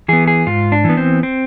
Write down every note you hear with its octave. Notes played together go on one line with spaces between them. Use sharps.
E3 B3 G#4
G#4
G#2 F4
D4
E3 B3
C4
C4